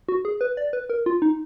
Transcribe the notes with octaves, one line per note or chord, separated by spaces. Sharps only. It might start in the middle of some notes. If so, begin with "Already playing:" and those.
F#4
G#4
B4
D5
B4
A#4
F4
D#4